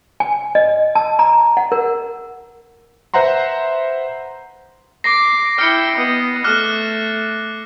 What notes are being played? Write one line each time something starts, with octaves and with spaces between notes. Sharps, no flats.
G#5
D#5
A5
A#5
F#5
A#4
B4 C5 E5 F#5 A#5 C6
D6 A#6 C7
E4 G5 F6 C#7
B3 D#5
A3 D6 F6 F#6